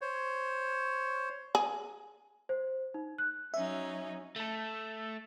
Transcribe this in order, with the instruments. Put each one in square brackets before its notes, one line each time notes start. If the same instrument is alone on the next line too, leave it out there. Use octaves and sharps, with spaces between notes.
[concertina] C5 C#5
[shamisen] G#4
[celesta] C5
D#4
F#6
[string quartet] F#3 C#4 D#4 [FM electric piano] E5
[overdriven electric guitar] A3 A4